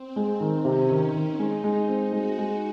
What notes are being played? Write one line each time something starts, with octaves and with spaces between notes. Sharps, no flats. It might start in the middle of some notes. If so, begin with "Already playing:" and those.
Already playing: C4
G#3
D#3
C3 C#4
D#3
D#3
G#3 D#4
G#3
C4
G#3 F#4
G#3